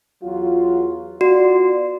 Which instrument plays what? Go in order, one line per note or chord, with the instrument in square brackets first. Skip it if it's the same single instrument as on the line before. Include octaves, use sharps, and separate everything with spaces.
[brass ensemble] E2 F#3 F4
[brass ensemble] B3 F4 D5 [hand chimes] F#4